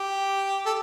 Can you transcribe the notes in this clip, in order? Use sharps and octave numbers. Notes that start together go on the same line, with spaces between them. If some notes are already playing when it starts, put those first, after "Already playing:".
Already playing: G4
A4